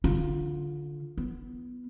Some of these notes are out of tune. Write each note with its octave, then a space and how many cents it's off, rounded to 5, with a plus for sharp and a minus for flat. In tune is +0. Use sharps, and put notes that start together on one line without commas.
D3 -15 F4 +0
B3 +0 E4 +40